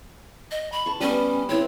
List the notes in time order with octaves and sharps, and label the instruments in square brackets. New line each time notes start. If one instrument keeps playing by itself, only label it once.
[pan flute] D#5
B5
[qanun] A5 C#6
[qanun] G3 B3 C#6 [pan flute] C#4
[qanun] C4 E4 B4 [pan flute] C#5